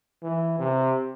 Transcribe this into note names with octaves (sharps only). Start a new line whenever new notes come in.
E3
C3